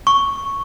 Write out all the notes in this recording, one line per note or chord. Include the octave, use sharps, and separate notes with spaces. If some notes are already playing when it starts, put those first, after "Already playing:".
C#6